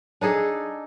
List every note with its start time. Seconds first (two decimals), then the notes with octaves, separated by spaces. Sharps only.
0.21 D4 D#4 G#4 A4